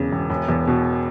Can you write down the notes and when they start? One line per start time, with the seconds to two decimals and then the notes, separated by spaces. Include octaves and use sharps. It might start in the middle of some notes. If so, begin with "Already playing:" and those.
Already playing: E1 E2 C#3
0.12 E1
0.30 E1
0.49 E2
0.67 B2